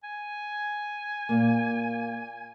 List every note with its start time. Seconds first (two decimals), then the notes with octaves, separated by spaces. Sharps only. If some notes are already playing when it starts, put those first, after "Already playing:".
0.04 G#5
1.29 A#2 A#3